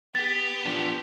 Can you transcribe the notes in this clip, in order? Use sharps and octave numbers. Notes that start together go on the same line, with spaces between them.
B3 G4 A6
F3 D4